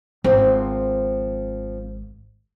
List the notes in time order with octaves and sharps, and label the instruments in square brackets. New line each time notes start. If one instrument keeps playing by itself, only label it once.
[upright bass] G#1 [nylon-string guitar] F3 C4